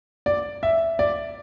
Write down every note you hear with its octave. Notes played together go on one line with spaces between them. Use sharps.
D5
E5
D5